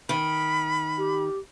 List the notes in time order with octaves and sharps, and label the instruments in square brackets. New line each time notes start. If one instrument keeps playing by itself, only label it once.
[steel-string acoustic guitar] D#3 [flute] B5
[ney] G4